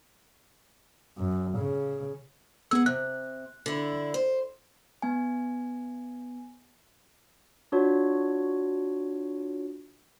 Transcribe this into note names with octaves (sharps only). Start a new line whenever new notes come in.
F#2
C#3
B3 G#4 F#5 E6
C3 F#6
D3 E4
C5
B3 G#5
D4 F4 F#4 C#5